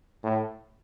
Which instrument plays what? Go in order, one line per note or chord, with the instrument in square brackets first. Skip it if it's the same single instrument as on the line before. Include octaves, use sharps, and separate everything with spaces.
[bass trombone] A2